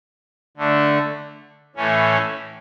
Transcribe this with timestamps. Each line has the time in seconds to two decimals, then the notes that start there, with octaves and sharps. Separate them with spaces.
0.57 D3 A3 D4
1.76 A2 E3 A3 C#4